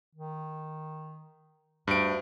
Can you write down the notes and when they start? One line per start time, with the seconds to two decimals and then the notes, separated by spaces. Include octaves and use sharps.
0.15 D#3
1.88 D2 G2 D7